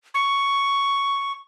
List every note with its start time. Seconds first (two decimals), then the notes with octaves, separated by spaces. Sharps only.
0.14 C#6